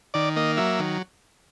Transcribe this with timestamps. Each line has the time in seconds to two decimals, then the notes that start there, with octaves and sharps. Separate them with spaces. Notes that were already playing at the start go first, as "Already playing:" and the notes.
0.14 D#3 D5
0.36 A#3 D#5
0.57 F#3 E5
0.79 D#3